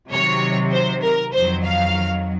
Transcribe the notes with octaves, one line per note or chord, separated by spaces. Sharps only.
C3 D#3 F#3 C#5
C5
A#4
F2 D#3 F#3 C5
F5